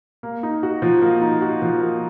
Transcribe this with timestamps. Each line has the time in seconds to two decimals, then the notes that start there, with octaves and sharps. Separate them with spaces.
0.23 A#3
0.43 D#4
0.63 F#4
0.82 F3
1.02 A#3
1.21 D#4
1.42 F#4
1.62 F3
1.81 A#3